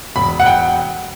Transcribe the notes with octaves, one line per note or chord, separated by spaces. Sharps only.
E1 B5
F#5
G5